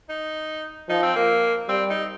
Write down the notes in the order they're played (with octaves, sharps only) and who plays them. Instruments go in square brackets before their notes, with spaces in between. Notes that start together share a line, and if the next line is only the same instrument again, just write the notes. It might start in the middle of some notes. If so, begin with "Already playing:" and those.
[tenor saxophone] D#4
[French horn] F3 [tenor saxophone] D#4
[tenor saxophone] C4
A#3
[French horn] G3 [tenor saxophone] C4
[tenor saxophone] D#4